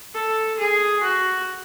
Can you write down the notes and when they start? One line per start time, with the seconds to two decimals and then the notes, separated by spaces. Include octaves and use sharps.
0.15 A4
0.59 G#4
1.03 F#4